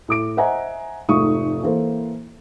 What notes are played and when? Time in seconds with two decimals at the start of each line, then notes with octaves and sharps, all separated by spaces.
0.08 A2 D6 D7
0.37 C5 D#5 E5 F#5 G#5 A#5
1.09 F1 G#2 A3 F4 C#6 D#6
1.63 E3 A#3 A4 C5